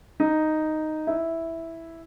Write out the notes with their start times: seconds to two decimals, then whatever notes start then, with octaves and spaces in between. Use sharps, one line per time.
0.20 D#4
1.07 E4